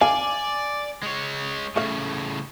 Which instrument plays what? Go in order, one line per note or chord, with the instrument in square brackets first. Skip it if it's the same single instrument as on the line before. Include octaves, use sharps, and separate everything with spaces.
[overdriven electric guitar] D5 [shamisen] F5 [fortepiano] G#5
[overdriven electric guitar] G#3 C#5
[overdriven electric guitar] A2 C#3 [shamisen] A3 F5